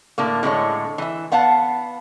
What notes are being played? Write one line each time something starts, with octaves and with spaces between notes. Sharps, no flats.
A2 D3 A#3
A2 D3 G#3 C#5
E3 E5
B3 F5 F#5 A5